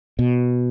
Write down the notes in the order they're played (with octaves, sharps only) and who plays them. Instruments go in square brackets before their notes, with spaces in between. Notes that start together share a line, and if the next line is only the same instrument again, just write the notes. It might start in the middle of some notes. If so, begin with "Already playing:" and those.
[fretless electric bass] B2